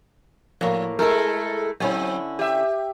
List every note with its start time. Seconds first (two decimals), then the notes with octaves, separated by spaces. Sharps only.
0.61 A2 F3 A#3
0.99 G#3 A3 E4 A4 A#4
1.80 D3 F#3 C4 C#4 E4
2.39 G4 E5